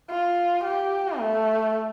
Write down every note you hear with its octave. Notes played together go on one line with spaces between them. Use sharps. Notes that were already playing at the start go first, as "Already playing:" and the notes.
F4
G4
A3